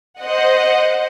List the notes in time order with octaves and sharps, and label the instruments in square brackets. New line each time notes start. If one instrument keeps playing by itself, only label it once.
[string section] C5 D#5 F#5